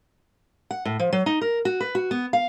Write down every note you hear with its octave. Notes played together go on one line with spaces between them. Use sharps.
F#5
A2
F3
F#3
D#4
A#4
F#4
B4
F#4
B3
F5